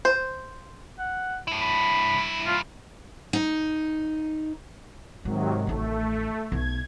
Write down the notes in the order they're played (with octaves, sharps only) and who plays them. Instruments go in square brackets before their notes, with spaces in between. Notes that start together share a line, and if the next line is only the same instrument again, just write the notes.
[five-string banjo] C5
[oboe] F#5
[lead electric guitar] G2 E4
[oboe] B5
F4
[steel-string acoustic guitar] D#4
[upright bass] G#2 [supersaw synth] C3 D#3 F#3
[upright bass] A1 D#3 [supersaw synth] A3
[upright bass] B1 [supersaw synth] G#6